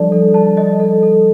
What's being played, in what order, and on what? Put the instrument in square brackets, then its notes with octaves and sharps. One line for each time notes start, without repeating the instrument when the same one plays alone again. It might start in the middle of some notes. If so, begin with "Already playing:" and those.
Already playing: [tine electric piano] F3 G3 [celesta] D4 A4 D5 A5
[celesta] A4
A5
D#5
A4
A4